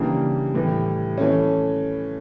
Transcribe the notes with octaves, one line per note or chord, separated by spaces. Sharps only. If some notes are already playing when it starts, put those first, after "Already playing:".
Already playing: C#3 E3 G3 A#3 D4
A2 E3 G3
E3 A3 C#4